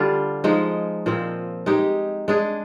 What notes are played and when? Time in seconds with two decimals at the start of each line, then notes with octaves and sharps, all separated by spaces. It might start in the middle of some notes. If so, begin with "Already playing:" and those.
Already playing: D3 G3 D4 F4
0.44 F3 G#3 D#4
1.06 A#2 F3 C4
1.66 G#3 D#4 G4
2.28 G#3 D4 G#4